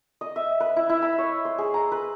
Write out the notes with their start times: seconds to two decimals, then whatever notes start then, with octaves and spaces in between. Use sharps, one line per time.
0.21 D#5
0.36 E5
0.60 B4
0.76 E4
0.89 E4
1.02 B5
1.18 C#5
1.45 C5
1.58 G#4
1.74 A#5
1.92 B4